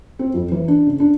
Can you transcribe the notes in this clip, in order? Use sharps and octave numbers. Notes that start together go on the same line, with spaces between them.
C4
F2
E3
D4
C#3
D4